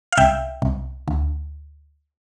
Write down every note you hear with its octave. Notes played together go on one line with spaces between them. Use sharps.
F5
C2 E5 G5
C2
D2